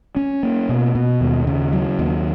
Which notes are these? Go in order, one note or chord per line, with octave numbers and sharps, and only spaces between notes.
C#4
A#3
B2
B2
D#2
C#3
F#3
D#2